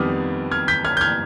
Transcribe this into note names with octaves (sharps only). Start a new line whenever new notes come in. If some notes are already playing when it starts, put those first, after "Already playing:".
Already playing: F2 D#3 G3 B3 D6 D#6 F6
F6 G#6
G6 B6
F6 G#6
G6
F6 G#6